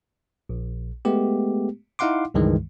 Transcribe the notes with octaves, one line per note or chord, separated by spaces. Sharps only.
A#1
G#3 A3 B3 G4
D#4 E4 F5 F#5 C6 D6
C#2 G2 D#3 E3 G#3